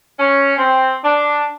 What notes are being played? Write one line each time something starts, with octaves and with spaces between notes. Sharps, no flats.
C#4
C4
D4